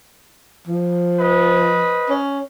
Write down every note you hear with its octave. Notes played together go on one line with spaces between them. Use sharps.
F3
B4 C5 D#5
C#4